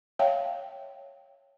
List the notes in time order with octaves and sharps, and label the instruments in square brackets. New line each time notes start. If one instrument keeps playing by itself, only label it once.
[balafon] C#5 E5 F5 G5 A5